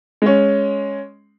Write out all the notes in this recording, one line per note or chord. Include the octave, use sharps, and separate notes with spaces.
G#3 C#4